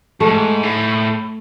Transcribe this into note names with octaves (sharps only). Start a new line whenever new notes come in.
G#2 A3
A2